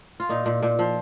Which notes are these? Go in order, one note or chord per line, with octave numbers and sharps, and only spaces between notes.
F4
A#2 D#4
A#2
A#2
F3